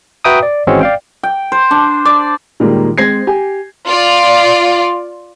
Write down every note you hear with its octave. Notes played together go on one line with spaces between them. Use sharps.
F#4 B4 E5 G5 A#5 D#6
D5
G#1 E3 G#3 C4 C#4 F#4
D5 F5 G5
G5
C5
D4
D5
A#2 D#3 G3 G#3 A#3 D#4
G#3 C4 C5 G#6 A#6 C7
G4 G#5
F4 D5